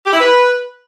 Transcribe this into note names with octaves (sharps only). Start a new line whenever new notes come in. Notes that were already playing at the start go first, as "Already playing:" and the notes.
G4
E4
B4